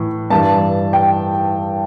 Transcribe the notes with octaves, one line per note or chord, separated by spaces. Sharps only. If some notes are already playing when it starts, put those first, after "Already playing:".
Already playing: A2 E3
G2 E3 A5
G5